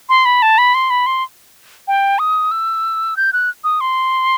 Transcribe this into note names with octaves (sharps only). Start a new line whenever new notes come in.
C6
B5
A5
B5
C6
B5
C6
G5
D#6
E6
G6
F#6
D#6
C6